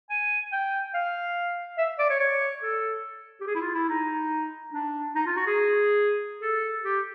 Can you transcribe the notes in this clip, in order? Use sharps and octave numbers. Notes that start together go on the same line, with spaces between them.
G#5
G5
F5
E5
D5
C#5
C#5
A4
G4
G#4
E4
F4
E4
D#4
D4
D#4
F4
F#4
G#4
A4
G4